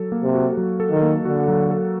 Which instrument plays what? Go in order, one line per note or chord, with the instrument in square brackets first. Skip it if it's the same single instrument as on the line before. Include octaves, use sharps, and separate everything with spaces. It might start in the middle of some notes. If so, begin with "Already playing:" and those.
Already playing: [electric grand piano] F#3 A4
A#3
[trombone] C3
[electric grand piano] F#4
F#3
A4
[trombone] D#3
[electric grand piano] A#3
[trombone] D3 [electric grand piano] F#4
[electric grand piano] F#3
A4